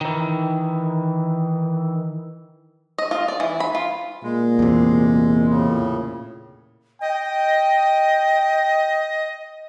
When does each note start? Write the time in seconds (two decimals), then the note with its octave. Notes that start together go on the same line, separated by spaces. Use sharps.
0.01 D#3 E3
2.98 D#5
3.11 F4
3.28 D5
3.40 E3
3.60 B5
3.75 F4
4.24 A#2 G#3
4.59 E2 C3
5.49 A2 C#3
7.01 D#5 G5